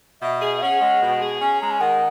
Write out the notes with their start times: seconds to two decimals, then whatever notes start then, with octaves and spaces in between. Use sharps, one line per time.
0.22 B2 E5
0.42 G#4
0.57 E5
0.62 C#4 F#5
0.81 G#3
1.02 B2
1.21 G#4
1.41 C#4 G#5
1.61 G#3 A#5
1.71 G#5
1.80 D#3 F#5